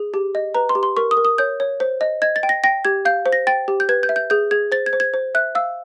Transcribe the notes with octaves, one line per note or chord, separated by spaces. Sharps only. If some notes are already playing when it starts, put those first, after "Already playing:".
Already playing: G#4
G4
D#5
B4 A#5
C6
G4
C6
A#4 C#6
D#6
A#4
D#6
C#5 G6
C#5
C5
D#5
D#5 G#6
A6
G5
A#6
G5 A#6
G4 G#6
F5 G6
C5
A#6
G5 A6
G4
G6
B4 G#6
G6
E5
G6
G#4 G6
G#4 G#6
C5 A6
G#6
C5
G#6
C5
E5 F#6
F5 E6